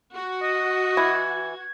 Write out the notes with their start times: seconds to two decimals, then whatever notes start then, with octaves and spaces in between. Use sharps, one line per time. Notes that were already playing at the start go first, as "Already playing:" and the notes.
0.14 F#4
0.42 D#5
0.97 E3 G#6